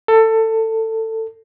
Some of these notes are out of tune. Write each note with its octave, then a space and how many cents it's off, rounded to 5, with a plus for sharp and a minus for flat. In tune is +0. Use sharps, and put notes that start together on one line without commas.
A4 +20